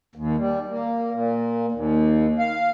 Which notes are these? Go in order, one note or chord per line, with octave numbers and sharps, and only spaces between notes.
D#2
G3
A#3
A#2
D#2
F5